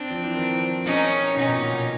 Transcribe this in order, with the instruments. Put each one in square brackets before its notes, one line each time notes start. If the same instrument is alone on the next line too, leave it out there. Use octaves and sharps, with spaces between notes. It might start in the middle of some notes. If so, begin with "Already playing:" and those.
Already playing: [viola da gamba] C4 D4
[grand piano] F3
E3
D#3
F3
[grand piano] D#3 [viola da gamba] C#4 D#4
[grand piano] B2 [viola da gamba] C#4 D#4
[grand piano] A#2
B2